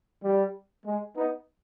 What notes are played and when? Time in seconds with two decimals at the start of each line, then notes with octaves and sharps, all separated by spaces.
0.23 G3
0.86 G#3
1.17 B3 D#4